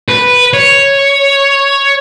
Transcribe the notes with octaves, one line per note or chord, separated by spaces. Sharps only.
B4
C#5